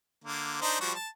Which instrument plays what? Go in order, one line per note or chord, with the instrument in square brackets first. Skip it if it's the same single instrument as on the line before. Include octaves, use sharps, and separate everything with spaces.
[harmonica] D3 A#3
D4 D#4 C5
F3 G3 F#4
A5